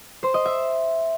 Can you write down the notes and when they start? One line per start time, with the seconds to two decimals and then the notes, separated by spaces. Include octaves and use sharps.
0.23 C5
0.34 D#5
0.45 E5